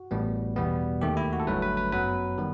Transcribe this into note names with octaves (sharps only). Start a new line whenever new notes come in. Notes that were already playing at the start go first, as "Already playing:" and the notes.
Already playing: F#4
A1 A2 G3 B3
E2 B2 G3 B3
D#2 D#3 A3 G4
E4
F#4
A4
G1 G2 F#3 A3 B4
B4
B4
F#2 F#3 B3 B4
D#3 G3 B3